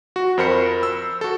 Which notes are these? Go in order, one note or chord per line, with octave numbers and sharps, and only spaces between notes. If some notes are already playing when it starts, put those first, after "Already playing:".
F#4
F2 A#4 C5 B5 C#7
E6
F#4 A4